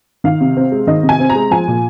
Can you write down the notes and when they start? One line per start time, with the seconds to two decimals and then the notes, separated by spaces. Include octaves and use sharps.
0.24 D#3 F5
0.41 C3
0.57 C4
0.72 G#3
0.87 D#3 D#5
1.03 C3
1.09 G#5
1.20 C4
1.30 A#5
1.35 G#3
1.51 F3 G#5
1.68 A#2